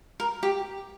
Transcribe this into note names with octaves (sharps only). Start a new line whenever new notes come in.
A#4
G4